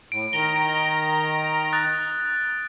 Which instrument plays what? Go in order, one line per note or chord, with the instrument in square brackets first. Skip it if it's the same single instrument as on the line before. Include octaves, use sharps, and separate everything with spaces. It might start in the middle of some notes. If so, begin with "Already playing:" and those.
[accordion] A2 [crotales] D7
[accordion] D#3 A#5 [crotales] G7
[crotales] D7
D#6 F#6 A6